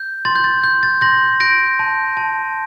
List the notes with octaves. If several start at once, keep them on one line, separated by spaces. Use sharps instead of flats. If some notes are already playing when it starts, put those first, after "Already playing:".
Already playing: G6
C6 A6
G6
A6
G6
A6
C6 G6 A#6
G6 A#6 D7
A5
A5